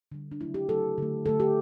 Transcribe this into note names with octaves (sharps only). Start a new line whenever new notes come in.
D3 G3
D4
C#3 F#3 A3 E4
G4
C#3 F#3 A3 A4
D3 A3
D3 A3 A4
G4